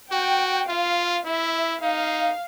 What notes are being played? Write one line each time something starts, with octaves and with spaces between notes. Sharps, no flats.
F#4 G5
F4 F5
E4 E5
D#4 F5